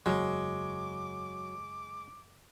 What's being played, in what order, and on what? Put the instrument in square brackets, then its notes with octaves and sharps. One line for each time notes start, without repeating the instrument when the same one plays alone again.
[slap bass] F#1 E2 [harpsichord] F#3 [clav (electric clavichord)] G#3 [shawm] D6